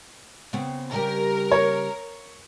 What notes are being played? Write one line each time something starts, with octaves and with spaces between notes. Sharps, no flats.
C#3 B3 C4
C#3 G3 G4 A#4
C#5